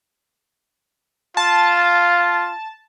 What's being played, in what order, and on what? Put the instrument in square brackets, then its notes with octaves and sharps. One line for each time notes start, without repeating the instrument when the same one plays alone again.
[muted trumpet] F4 [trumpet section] F5 [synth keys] A5